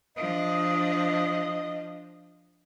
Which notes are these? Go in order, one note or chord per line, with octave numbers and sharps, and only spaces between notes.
F3 D4 D#5